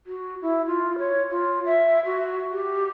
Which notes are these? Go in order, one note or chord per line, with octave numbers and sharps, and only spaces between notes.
F#4
E4
F4
C#5
F4
E5
F#4
G4